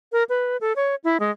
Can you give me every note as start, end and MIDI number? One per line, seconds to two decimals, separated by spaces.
0.12 0.24 70
0.29 0.57 71
0.61 0.73 69
0.76 0.95 73
1.04 1.17 64
1.20 1.31 56